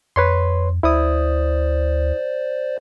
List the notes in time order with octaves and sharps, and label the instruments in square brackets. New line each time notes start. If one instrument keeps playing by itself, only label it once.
[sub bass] F2 [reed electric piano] B4 C#5 C6
[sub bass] D2 [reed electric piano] E4 D#6 [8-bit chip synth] C5 D5